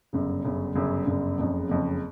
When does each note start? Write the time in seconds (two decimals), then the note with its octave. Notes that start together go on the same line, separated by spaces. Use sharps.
0.13 G1 F#2 C#3
0.44 G1 F#2 C#3
0.75 G1 F#2 C#3
1.06 G1 F#2 C#3
1.38 F#1 F2 C#3
1.69 F#1 F2 C#3